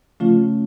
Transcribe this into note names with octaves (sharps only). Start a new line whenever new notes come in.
C#3 F3 A3 C#4 F4